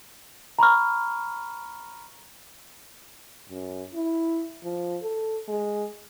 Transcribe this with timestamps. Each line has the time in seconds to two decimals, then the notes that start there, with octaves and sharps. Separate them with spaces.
0.59 A#5 B5 C#6 F6
3.49 F#2
3.94 E4
4.64 F3
5.02 A4
5.48 G#3